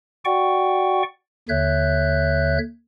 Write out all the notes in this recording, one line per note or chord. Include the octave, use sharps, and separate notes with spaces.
F#4 D5 F#5 G5 C#6
D#2 D3 C#5 E5 F#6 G6